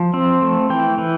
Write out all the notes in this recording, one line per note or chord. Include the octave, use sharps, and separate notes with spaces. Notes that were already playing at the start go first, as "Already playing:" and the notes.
Already playing: F3
C4
A3
E3 G5
E3